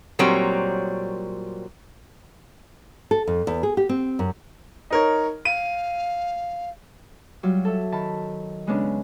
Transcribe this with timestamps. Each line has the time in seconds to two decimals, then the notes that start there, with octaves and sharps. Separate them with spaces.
0.19 A#2 F#3 G3 A#3 C4 C#5
3.11 A4
3.27 F2
3.47 E2
3.63 G#4
3.77 G4
3.89 C4
4.19 F#2
4.90 D#4 A#4 C#5
5.45 F5 D#7
7.43 F#3 G3 F4
7.65 A4 E5
7.92 D#3 A5 B5
8.67 C#3 G#3 B3 C#4 D4